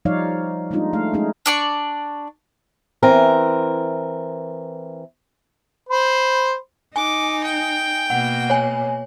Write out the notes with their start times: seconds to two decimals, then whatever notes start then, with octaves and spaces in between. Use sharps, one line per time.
0.05 F3 G3 D#4 C#5 D5 F5
0.71 G3 G#3 A#3 D4 D#4 F4
0.93 A3 F5
1.13 G#3 A3 C#4 D#4 G#4
1.46 D4 D5 C#6
3.03 E3 C4 A#4
5.89 C5 B5
6.96 D#4 G#5 D6
7.44 G5
8.10 B2 A#3 F#5
8.50 C#5 G#5